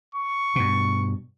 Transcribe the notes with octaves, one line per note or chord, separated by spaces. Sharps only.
C#6
G2 B2